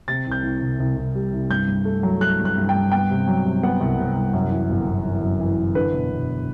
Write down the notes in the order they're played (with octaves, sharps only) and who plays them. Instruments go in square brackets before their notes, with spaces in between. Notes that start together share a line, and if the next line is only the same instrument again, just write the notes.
[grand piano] C3 A6
C2 G6
C2
C2
C2
C2
G3
C2
G2 G6
G2
A3
F#3
A3 F#6
G2
F#6
G2
G5
G2
B3 G5
C3
F#3
C3
B3 F#5
C2
C3
C2
F#2
E3
G1
G1
E3
F#2
E3
E3
D3 B4
E1
E1